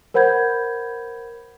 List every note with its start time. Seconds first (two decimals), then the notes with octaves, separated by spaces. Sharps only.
0.14 A#4 C5 F#5 B5 G6 G#6